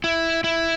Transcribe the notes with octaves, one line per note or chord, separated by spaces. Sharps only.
E4
E4